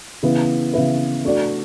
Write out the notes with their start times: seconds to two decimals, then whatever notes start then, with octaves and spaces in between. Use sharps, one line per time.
0.23 C#3 E3 B3 E4 B4
0.73 C#3 E3 B3 E4 B4
1.24 A3 D4 F#4 A4 D5